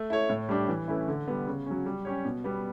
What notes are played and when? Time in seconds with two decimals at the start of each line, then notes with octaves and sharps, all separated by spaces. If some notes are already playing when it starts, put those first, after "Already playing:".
Already playing: A3
0.10 E4 A4 C#5
0.29 A2
0.49 G3 D4 G4
0.68 E3
0.88 A3 C#4 E4 B4
1.08 D3
1.27 G3 B3
1.47 C#3
1.66 F#3 C#4
1.86 G3
2.05 C#4 G4 C#5
2.25 B2
2.44 G3 B3